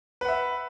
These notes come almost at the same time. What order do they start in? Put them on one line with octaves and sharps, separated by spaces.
B4 F#5 E5